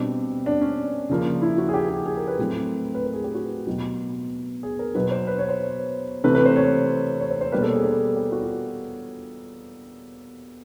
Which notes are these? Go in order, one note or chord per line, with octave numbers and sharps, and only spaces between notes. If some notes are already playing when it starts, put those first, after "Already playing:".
Already playing: B2 G3 C4 D4
D4
C#4
C#3 F3 A#3
E4
F#4
G#4
G4
G#4
G#4
A#4
B4
A2 F#3 A3 C4
B4
A#4
G#4
G4
F#4
B2 F#3 B3
G#4
A#4
B2 F#3 B3 B4
C5
B4
C#5
C5
C3 E3 A3 C4 B4
B4
C5
C#5
C#5
C5
C5
B2 G3 A#3 B4
A4
G#4
A4
G4
F#4
F4